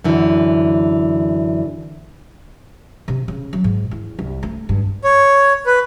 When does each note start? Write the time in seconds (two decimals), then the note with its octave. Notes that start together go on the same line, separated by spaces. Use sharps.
0.04 F#2 D3 E3
3.08 C3
3.28 C#3
3.53 F#3
3.64 G#2
3.91 E2
4.19 C2
4.43 A3
4.69 G2
5.04 C#5
5.66 B4